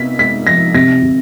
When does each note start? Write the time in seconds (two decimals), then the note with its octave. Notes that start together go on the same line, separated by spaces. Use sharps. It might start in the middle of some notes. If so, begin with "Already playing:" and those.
Already playing: C3 B3 B6
0.19 G#3 B6
0.47 F3 A#6
0.74 C3 A#6
1.02 C3